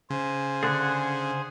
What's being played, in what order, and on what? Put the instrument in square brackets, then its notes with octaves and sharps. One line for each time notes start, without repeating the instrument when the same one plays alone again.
[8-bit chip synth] C#3 [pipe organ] C5 G#5
[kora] D3 [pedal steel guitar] G#4 F#5